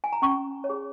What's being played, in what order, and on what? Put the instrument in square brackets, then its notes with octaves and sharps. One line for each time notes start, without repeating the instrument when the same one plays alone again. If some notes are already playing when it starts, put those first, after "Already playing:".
[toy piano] G#5
A#5
C#4 C#6
C#5
G#4